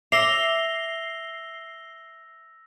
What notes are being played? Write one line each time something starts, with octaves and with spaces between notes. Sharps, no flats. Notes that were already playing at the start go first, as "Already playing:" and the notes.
E5 D6 E6 A#6 C7 F7 G7